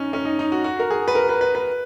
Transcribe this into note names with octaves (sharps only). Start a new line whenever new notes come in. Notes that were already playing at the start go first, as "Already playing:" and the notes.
Already playing: C#4 D#4
C#4
D#4
D#4
F#4
F#4
A#4
G#4
B4
A#4
B4
B4
B4